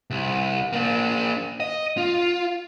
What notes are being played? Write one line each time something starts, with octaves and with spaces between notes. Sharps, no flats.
C2
A#3 D4
D#5
F4